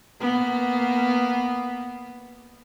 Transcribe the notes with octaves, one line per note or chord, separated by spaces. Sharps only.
A#3 B3